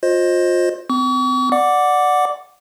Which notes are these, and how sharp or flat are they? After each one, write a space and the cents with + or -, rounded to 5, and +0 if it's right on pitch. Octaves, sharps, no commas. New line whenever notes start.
F4 +30 C5 +15 D#5 +0
C4 -35 C#6 +40
D5 +10 F#5 -10 D6 -10